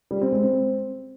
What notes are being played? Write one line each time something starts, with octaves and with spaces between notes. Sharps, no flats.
G3
C4
G#3
C4